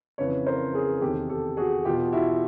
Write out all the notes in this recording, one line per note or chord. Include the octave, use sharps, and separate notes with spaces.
F2 C#3 E3 B4 C#5
A#4 C5
G#4 A#4
E2 C3 D#3 G4 A4
G4 A4
F#4 G#4
E2 B2 F4 G4
E4 F#4